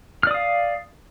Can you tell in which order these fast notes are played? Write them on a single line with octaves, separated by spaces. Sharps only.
F6 D5 D#6 F5